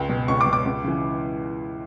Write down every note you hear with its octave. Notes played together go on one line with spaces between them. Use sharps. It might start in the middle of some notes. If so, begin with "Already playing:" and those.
Already playing: C#2 G5
B2
C#2 C#6
D6
B2
D6
C#2
C#3 E3